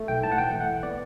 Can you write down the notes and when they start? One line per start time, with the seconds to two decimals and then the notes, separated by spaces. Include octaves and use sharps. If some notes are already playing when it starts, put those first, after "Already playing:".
Already playing: A3
0.08 B1 G5
0.23 A2 A5
0.32 F#5
0.38 E3 G5
0.53 A3
0.61 F#5
0.68 B1
0.83 B3 D5